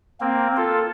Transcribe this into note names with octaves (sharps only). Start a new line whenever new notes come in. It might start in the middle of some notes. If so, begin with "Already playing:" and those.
A#3 C4
F4 A4